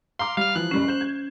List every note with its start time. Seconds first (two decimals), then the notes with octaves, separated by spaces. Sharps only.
0.19 F5 A#5 C6 D6
0.37 G3 F5 F6
0.56 E3 F3 F#6
0.71 F#1 G3 C#4 C7
0.87 C5 G6 E7
1.01 G#6